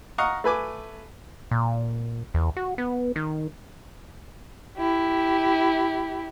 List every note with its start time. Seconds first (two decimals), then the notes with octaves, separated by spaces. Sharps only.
0.18 D#5 F5 F#5 A#5 C#6 D#6
0.44 A3 B4 G#5 D6
1.51 A#2
2.34 E2
2.57 F#4
2.78 B3
3.16 D#3
4.77 E4 G4